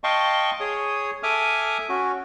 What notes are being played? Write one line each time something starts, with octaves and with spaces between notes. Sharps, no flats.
D#5 F5 G5 A5 C6 C#6
G#4 C#5 D#6
A4 E5 G#5 D6 D#6 F6
C#4 F#4